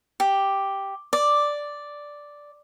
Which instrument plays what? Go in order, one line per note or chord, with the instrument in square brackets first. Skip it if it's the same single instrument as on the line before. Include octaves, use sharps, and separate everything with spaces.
[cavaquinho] G4
D5